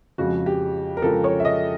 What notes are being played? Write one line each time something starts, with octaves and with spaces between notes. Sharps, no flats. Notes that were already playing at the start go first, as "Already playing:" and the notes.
F2 C#3 F3 G#3 F#4
G4
A#4
F2 C#3 F3 G#3 A4
C#5
E5
D#5